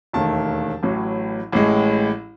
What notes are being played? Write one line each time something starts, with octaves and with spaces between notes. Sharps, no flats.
E1 D#2 D#3 A3 A5
A1 A2 F#3
A1 A2 G#3